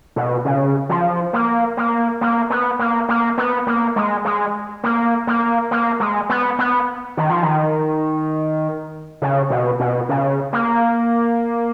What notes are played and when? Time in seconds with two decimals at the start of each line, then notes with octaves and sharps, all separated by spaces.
0.16 B2
0.45 C#3
0.89 F3
1.33 A#3
1.77 A#3
2.21 A#3
2.50 B3
2.79 A#3
3.09 A#3
3.38 B3
3.67 A#3
3.96 G#3
4.25 G#3
4.84 A#3
5.27 A#3
5.71 A#3
6.00 G#3
6.29 B3
6.59 B3
7.17 D#3
7.30 F3
7.43 D#3
9.22 C#3
9.50 B2
9.80 B2
10.09 C#3
10.53 A#3